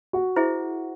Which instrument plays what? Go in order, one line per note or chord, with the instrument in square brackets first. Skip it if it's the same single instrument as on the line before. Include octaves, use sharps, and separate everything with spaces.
[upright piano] F#4
[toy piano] E4 G#4 C5 E5